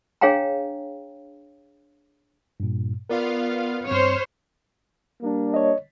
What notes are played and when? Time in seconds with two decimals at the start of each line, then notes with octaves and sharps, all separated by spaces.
0.21 D4 G#4 C#5 F5 G5 A#5
2.60 G2 A#2
3.10 B3 F4 A#4 D5 F5
3.88 G2 C4 C5 C#5 F6
5.22 G3 A#3 D4
5.54 C#5 D#5